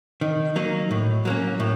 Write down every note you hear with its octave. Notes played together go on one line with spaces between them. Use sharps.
D#3
F#3 A#3 D#4
A2
F#3 A#3 C#4
A2